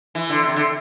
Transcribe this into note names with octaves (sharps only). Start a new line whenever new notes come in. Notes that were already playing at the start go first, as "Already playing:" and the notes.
E3
D3
C3
D3